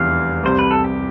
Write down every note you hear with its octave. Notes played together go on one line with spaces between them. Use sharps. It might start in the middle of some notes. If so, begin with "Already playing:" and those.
Already playing: F1 E2 C3 E3 G3 F5
C2 C3 G3 C5
B4
A4
G4